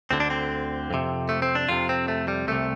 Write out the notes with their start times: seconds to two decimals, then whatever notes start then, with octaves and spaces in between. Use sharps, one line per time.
0.11 D2 D3 C4
0.20 D4
0.30 C4
0.91 F2 C3
1.29 A3
1.42 C4
1.55 D4
1.69 F2 C3 F4
1.89 C4
2.08 A3
2.28 G3
2.48 C2 C3 A3